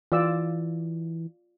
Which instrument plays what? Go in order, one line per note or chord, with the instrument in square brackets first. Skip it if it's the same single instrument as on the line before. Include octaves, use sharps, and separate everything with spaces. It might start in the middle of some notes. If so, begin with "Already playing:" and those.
[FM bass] E3 [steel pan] F4 D5 E6